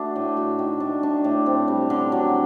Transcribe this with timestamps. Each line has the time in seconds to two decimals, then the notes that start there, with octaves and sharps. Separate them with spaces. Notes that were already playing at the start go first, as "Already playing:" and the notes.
Already playing: A3 D4 F#4
0.16 A2
0.37 F#4
0.59 D#3
0.80 D4
1.03 D4
1.24 A2
1.46 C4
1.68 G3
1.90 D3
2.12 F#3